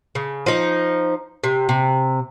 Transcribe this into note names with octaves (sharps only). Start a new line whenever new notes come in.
C#3
F3 D#4
C3
C3